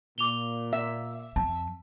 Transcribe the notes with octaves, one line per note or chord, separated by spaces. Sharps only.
A#2 D6 F7 G7
E5
F2 A5